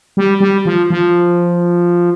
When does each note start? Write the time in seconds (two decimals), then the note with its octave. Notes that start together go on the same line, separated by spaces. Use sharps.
0.17 G3
0.40 G3
0.66 F3
0.90 F3